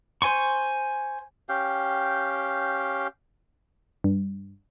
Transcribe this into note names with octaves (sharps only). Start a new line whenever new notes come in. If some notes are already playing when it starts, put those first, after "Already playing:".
C5 G#5 C6 C#6
C#4 G4 F5 G5
G2